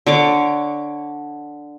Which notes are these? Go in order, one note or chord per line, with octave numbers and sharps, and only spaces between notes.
D3 C#5 D6